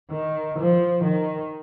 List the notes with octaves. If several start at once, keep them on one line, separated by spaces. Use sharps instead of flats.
D#3
F3
D#3